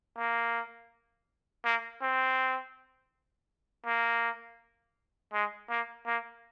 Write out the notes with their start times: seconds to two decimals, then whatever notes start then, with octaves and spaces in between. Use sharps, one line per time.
0.18 A#3
1.65 A#3
2.02 C4
3.86 A#3
5.33 G#3
5.70 A#3
6.06 A#3